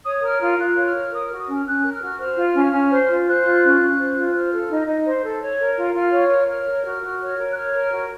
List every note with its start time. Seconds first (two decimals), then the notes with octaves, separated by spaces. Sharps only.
0.04 C#5 D#6
0.21 A#4 F6
0.40 F4 F6
0.58 F4 F#6
0.75 C#5
0.85 F6
0.93 A#4
1.11 A#4 D#6
1.25 F#4 F6
1.37 D#6
1.47 C#4 F6
1.65 C#4 F#6
1.83 A#4
1.92 F6
2.01 F#4
2.18 C5 F6
2.36 F4
2.54 C#4
2.72 C#4
2.90 C5
3.08 F4
3.26 C5 F#6
3.44 F4
3.62 C#4
3.80 C#4
3.97 C5
4.15 F4
4.34 C5 F6
4.51 A4
4.69 D#4
4.87 D#4
5.05 C5
5.23 A4
5.41 C#5
5.59 A#4
5.76 F4
5.94 F4 F6
6.12 C#5
6.30 A#4
6.48 C#5 F6
6.66 A#4
6.84 F#4
7.02 F#4
7.20 C#5
7.37 A#4
7.50 F#6
7.55 C#5 F6
7.73 A#4
7.91 F#4